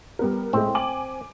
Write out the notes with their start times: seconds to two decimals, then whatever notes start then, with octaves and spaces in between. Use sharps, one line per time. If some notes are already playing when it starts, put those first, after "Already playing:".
0.19 G3 B3 A#4
0.53 A2 G#3 C4
0.75 G#5 D6 F#7